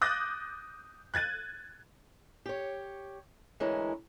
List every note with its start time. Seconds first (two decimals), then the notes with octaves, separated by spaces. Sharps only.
0.01 D6 D#6 F#6 G6 A6 A#6
1.14 F#6 G#6 A6 D#7
2.46 G4 C#5
3.60 D2 E3 G#3 C#4 E4 A#4